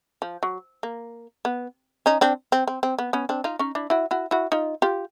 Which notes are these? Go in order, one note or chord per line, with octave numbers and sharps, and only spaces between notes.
F3
F#3
A#3
B3
C#4 D#4
C4 D4
C4
C4
C4
B3
B3 C#4
C4 D4
D#4 F4
C#4 D#4
D4 E4
E4 F#4
E4 F#4
E4 F#4
D#4 F4
F4 G4